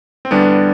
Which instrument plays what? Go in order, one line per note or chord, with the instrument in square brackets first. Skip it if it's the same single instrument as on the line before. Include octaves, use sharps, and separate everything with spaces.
[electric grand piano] C4
E2 D3 G3 B3 D4